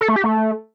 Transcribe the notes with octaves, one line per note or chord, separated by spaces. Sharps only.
A4
A3
G4
A3